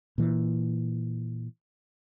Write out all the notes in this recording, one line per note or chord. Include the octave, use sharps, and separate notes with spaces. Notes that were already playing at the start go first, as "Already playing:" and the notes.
A#2 E3